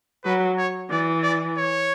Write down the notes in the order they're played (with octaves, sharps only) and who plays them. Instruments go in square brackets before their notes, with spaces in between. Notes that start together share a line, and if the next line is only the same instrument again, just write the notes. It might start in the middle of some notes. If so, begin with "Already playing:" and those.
[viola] F#3 [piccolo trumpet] B4
[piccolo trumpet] C#5
[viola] E3 [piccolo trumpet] D5
[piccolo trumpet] D5
C#5